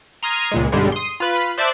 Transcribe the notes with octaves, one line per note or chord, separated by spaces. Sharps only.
A#5 C6 D#6 F6 G#6
C#2 A#2 G#3
B1 G2 D3 G3 G#3
C6 D#6
F4 B4 B5
C5 D5 E5 A5 D6 F#6